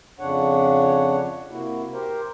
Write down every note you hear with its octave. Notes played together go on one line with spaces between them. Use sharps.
F2 C#3 D4 C#5 F#5
C3 A#3 E4 F#4
G4 A#4 C5